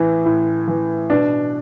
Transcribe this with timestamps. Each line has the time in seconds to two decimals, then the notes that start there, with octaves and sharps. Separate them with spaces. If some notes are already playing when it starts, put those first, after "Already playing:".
Already playing: A2 E3
0.26 A2
0.68 E3
1.10 B2 D4